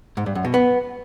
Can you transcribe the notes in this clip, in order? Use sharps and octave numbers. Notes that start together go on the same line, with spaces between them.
G#2
G2
F#2
B2
B3